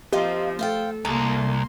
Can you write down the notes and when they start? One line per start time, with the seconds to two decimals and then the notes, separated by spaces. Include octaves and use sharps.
0.13 F3 A#3 C4 F4 G4 D#5
0.59 A3 A4 C5 F5 G5
1.05 C2 A#3 A4 C6